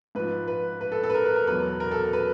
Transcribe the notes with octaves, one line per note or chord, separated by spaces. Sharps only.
G#2 F3 B4
B4
B4
A4
A4
B4
A#4
B4
A#4
E2 B2 F#3 B4
A#4
A4
A#4
B4